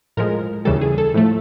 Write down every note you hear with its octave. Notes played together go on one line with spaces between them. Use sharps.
A2 F3 G#3 A#4
D#2 C#3 E3 G3 A4
G#4
A4
A2 F3 A3